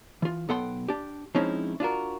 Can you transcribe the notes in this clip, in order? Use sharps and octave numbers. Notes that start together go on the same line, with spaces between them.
E3 F4
B1 B3 A4 F#5 G5 C6
D4 G4
F3 G#3 C4 C#4 D#4 E4
D4 F4 F#4 A#4